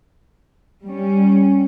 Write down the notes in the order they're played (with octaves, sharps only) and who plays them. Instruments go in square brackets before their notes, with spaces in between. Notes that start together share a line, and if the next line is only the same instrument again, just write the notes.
[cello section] G3 C#4